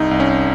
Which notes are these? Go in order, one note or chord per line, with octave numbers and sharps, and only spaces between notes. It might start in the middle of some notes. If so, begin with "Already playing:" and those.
Already playing: C2 D#4
C2
C#4
C2